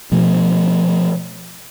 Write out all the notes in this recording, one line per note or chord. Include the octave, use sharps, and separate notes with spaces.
B2 F3 A3